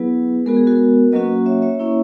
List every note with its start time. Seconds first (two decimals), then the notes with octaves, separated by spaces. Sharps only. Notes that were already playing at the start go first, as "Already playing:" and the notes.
Already playing: F#3 B3 E4 G#4 B4
0.46 G#3 B3 F#4 A#4
0.57 G#4
0.67 F#4 A#4
1.12 F#3 A#3 C#4 F#4 B4 D#5
1.46 C#5 E5
1.62 C#5 E5
1.79 A#3 C#4 E4